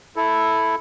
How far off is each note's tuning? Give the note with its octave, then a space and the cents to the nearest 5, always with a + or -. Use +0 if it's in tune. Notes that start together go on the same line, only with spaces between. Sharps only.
E4 +0 A4 +0